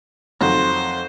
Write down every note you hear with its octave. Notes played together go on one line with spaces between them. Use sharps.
F2 D#3 F#3 C5